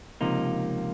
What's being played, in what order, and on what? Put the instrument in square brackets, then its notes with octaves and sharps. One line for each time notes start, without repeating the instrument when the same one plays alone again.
[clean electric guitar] C#2 C3 F3 A#3 D#4